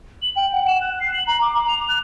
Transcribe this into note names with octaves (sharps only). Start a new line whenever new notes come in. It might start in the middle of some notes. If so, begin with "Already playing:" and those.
F#7
G5
F#5
E7
F#6
C7
F#7
A#5
D6
A#5
F7
F#6